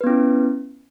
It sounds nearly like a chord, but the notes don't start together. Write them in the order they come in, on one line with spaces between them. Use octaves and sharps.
B4 B3 C#4 E4